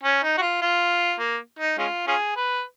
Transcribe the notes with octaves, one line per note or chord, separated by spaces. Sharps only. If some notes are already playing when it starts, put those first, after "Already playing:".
C#4
D#4
F#4
F4
F4
A#3
D#4
G#3 C#4 F4
C#4 F4 G#4
B4